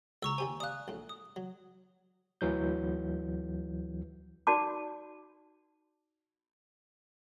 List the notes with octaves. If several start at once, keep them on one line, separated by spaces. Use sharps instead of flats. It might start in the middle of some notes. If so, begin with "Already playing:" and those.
C#2 A#5 C#6 E6
D#2 G4 C5 G#5
D5 F5 D#6 F#6
A#1 A2
D#6
F#3
D2 E3 F#3 G6
D#4 F#4 D5 A5 D6